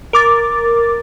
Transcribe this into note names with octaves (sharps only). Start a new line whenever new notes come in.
A#4 D6 A6